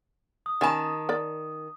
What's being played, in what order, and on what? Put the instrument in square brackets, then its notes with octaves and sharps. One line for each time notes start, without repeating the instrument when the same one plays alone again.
[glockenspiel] D#6
[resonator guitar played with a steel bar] D#3 A5 [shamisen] C#4 G#5 B5
[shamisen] A#4 D5